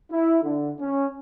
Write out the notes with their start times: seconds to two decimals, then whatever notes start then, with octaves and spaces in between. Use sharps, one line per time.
0.11 E4
0.43 D3
0.80 C#4